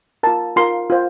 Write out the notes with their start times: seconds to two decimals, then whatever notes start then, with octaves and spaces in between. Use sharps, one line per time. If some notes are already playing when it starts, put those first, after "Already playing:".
0.23 F4 A#4 A5
0.56 F4 A#4 C6
0.90 F4 C5